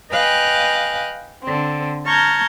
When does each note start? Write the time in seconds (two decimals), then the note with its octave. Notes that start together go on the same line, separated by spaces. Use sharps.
0.12 B4 D#5 F5 G5 G#5 F#6
1.42 D3 C4
2.05 A5 A#5 C#6 F6 G6 G#6